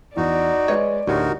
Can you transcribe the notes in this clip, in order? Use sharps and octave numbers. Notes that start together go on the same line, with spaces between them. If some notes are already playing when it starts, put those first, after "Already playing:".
E2 D#4 F#4 D5
G#3 B4 C#5 D#5
D2 A2 D#4 F#4 G4 A#4